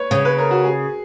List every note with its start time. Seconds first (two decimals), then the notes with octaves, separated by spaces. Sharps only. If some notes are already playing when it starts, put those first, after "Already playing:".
Already playing: B4 C#5
0.11 C#3 C#5
0.25 B4
0.38 A#4
0.51 F#4
0.64 G#4